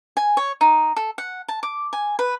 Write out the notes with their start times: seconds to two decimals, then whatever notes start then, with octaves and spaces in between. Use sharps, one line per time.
0.17 G#5
0.37 C#5
0.61 D#4
0.96 A4
1.18 F#5
1.48 A5
1.63 D6
1.93 G#5
2.19 B4